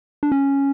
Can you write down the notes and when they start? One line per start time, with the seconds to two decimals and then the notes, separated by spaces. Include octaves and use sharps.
0.23 D4
0.32 C#4